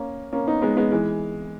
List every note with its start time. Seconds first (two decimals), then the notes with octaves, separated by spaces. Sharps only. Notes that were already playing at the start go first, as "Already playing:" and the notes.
Already playing: A#3 C#4
0.33 A#3 C#4
0.47 B3 D#4
0.62 G#3 B3
0.77 G#3 B3
0.91 E3 G#3